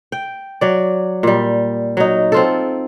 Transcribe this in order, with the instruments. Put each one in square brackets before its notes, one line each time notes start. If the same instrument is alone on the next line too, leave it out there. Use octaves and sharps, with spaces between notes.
[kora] G5
F#3 D5
A#2 G3
F#3 D#4
C4 F4 A4